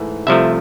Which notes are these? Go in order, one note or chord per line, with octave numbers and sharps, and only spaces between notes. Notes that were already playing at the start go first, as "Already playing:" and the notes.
Already playing: G#2 E3 A3
C2 C3 F3 A3 E5